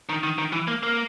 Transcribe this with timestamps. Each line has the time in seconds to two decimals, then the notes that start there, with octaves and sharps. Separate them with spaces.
0.09 D#3
0.23 D#3
0.38 D#3
0.53 E3
0.68 A#3
0.83 A#3